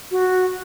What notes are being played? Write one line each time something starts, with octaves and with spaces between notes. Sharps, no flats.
F#4